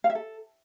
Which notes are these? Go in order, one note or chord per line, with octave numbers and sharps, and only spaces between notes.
F5
E5
A4